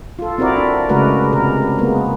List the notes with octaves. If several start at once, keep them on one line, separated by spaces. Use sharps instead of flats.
F4 A4
C4 E4 F#4 A#4 D5
D4
C#3 G#3 A3 F#4 A#4 B4
C3 A#4
G#3 A#3 B3